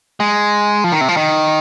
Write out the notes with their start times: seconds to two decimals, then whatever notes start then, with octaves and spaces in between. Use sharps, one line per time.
0.20 G#3
0.84 F3
0.92 D#3
1.01 C3
1.08 F3
1.17 D#3